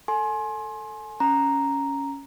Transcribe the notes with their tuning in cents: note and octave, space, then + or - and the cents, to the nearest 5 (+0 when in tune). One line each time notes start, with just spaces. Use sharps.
A4 +15 G#5 +30 C6 +25
C#4 +0 A#5 +0